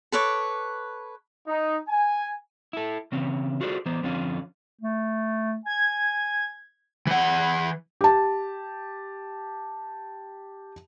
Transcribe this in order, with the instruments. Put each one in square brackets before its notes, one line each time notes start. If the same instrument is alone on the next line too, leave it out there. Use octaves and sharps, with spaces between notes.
[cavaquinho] A4 B4 C#5 D6
[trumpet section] D#4
G#5
[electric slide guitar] E4 A4
C#3 E3 C4 C#4
F4 F#4 G#4 A4 C5 D5
E3 B3 C5
F2 D3 F3 C4 C#4 F4
[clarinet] A3
[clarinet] G#5 [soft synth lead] G#6
[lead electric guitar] E3 F#5
[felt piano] G4 A5